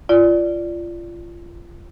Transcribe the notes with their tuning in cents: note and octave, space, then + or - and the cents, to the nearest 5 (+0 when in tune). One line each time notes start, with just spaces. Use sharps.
F4 -25 D5 +0